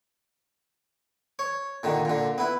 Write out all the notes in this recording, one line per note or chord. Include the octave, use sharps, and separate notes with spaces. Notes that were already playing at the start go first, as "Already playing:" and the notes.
C#5
A#2 D3 D#3
A#2 D3
B3 E4